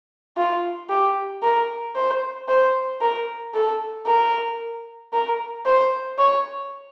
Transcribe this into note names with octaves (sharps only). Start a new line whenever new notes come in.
F4
G4
A#4
C5
C5
A#4
A4
A#4
A#4
C5
C#5